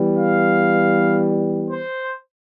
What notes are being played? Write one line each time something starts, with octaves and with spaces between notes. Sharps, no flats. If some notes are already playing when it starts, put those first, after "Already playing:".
Already playing: E3 G3 B3
F5
C5